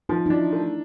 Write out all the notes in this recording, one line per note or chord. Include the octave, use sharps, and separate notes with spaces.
F3 D#4
D#4
D4 E4
A3